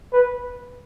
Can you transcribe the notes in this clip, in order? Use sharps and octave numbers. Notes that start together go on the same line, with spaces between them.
B4